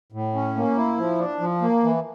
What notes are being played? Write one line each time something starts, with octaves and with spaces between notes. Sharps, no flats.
A2
C#4
A#3
E4
F3
D4
F3
A#3
E3